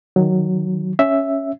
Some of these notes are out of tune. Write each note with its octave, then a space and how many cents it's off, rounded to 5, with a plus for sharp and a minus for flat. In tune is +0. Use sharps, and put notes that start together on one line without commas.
D#3 +0 F#3 +0
C#4 +0 E5 +0